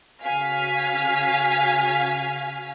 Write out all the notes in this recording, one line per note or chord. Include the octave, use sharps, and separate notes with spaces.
C#3 F#4 F5 G#5 F6 B6